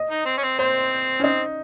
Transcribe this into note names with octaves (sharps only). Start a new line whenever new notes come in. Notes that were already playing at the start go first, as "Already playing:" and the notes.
Already playing: D#5
D#4
C4
C#4
C4
C4 C5
C#4
C4 D#4